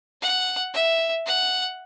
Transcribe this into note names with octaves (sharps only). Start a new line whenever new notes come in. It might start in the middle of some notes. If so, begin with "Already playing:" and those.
F#5
E5
F#5